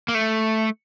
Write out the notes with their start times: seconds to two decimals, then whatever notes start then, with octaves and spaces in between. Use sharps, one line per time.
0.08 A#3
0.15 A3